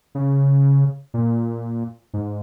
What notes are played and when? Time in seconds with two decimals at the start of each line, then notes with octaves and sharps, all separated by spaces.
0.15 C#3
1.14 A#2
2.14 G#2